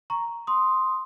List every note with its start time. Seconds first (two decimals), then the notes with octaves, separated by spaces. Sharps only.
0.10 A#5 C#6
0.47 C6 D#6